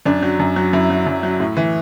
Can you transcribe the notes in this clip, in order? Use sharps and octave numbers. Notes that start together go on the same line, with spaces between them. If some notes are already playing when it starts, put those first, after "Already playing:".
F#2 D4
F#3
F#2
F#3
F#2 E4
F#3
F#2
F#3
A2
E3